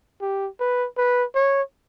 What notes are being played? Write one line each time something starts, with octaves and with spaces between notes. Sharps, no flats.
G4
B4
B4
C#5